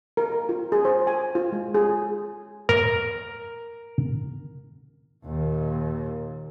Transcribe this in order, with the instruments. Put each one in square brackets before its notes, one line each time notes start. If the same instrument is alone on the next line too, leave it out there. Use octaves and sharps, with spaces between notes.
[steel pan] A#4
A#4
F4
G#4
C5
G#5
F4
G#3
G#4
[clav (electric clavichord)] A#4
[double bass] D#2 A#2